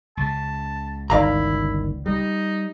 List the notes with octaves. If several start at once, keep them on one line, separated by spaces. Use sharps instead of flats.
C#2 C#3 A5
G1 D#3 E4 D5 F5 A#5
G3 D#4